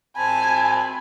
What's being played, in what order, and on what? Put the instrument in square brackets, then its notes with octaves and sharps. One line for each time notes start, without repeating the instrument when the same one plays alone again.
[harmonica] C4 A5 B5 [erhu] G#5